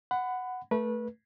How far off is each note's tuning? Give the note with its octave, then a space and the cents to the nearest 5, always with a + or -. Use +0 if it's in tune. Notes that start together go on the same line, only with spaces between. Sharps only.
F#5 +0 B5 +25
A3 +0 B4 -30